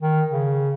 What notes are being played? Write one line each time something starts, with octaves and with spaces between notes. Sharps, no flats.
D#3
C#3